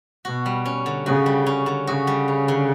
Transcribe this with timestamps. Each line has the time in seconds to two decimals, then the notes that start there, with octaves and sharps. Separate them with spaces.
0.25 B2 F#4
0.46 G3
0.65 C#4
0.86 D3
1.06 C#3 F#4
1.26 G3
1.46 C#4
1.66 D3
1.87 C#3 F#4
2.07 G3
2.28 C#4
2.48 D3